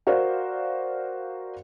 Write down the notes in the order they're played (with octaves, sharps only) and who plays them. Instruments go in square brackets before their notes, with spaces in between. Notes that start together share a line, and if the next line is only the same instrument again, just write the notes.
[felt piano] F#4 A#4 C5 D5 F5